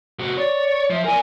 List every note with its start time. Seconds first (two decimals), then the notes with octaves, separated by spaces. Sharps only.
0.19 C3 F#4
0.37 C#5 D5
0.90 F3 E5
1.05 A#4 D5 G#5